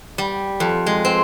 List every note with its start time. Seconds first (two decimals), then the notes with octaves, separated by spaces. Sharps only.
0.18 G3
0.60 F2
0.86 G#3
1.05 C4